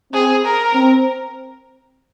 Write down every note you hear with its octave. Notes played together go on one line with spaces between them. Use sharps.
C4 G#4
A#4
C4